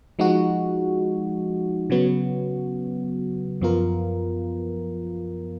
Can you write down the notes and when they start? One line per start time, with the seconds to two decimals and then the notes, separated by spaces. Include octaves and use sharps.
0.19 F3 G#3 D#4 F#4
1.90 C#3 F#3 B3 F#4
3.61 F#2 F3 B3 F4 A#4